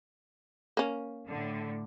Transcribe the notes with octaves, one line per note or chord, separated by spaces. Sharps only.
A#3 C#4
A2 D3